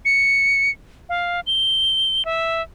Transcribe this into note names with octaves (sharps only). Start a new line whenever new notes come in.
C#7
F5
G7
E5